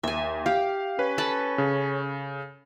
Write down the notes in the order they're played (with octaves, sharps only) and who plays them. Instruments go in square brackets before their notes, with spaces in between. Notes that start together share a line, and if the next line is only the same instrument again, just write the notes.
[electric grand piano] D#2 [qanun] E5 G#5
[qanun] G4 [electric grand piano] F5
[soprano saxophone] C#4 [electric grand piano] B4
[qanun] A4 A5 B5
[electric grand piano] C#3